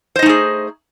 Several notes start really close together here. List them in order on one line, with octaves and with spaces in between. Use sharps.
C5 D#5 D#4 A3 G#4